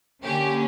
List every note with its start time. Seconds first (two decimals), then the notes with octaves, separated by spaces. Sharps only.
0.22 D3 A#3 C#4 G4